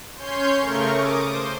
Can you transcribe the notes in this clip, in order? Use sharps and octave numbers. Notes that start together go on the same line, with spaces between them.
C#4 C#5 C6 G6
C#3 A3 A#4 C#6
D6 D#6
C5